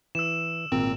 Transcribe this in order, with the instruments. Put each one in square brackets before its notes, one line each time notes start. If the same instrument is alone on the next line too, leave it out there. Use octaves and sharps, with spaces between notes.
[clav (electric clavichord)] E3 [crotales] E6 E7
[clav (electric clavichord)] G#1 A#2 A#4 [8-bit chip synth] C4